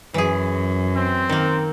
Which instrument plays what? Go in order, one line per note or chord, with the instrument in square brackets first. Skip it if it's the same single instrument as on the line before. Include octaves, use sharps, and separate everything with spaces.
[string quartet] F#2 [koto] E3 G#4
[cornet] C4
[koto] D#3 A#3